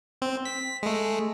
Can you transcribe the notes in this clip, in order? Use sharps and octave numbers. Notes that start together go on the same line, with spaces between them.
C4
B6
G#3 A3